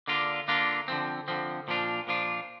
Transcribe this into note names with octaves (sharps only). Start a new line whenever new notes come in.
D3 A#3 D4 F4
D3 A#3 D4 F4
D3 F3 C4
D3 F3 C4
A#2 F3 D4 F4
A#2 F3 D4 F4